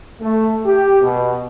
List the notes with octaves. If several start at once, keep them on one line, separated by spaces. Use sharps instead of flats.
A3
G4
B2